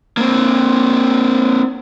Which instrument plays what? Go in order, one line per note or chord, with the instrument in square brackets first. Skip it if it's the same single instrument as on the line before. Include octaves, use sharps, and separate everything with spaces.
[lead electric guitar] A#3 C4